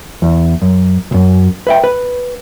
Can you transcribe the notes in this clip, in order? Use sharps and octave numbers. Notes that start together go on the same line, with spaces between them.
E2
F#2
C2 F#2
B4 E5 G5
B4